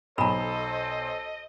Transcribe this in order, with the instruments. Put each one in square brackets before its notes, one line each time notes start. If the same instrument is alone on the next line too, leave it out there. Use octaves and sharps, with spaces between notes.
[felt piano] B1 [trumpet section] A4 C5 [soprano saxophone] D#5 [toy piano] A#5 B5